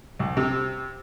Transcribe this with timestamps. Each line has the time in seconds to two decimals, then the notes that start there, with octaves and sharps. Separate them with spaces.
0.19 C2
0.37 C3